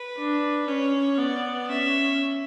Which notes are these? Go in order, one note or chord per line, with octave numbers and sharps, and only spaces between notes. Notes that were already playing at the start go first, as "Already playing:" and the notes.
Already playing: B4
D4
C#4 C#5
B3 D5
C#4 E5